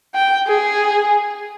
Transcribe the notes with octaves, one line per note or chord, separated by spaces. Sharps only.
G5
G#4